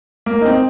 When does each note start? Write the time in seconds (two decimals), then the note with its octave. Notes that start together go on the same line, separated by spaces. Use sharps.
0.26 A#3
0.41 D#4
0.45 C4